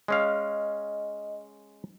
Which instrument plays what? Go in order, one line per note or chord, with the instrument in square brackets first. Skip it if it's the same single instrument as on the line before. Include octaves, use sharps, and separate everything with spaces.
[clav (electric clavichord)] G#3 C#4 F5 [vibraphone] D#5